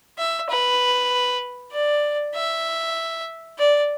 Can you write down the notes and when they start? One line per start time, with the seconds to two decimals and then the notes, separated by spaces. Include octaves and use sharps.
0.18 E5
0.49 B4
1.72 D5
2.35 E5
3.59 D5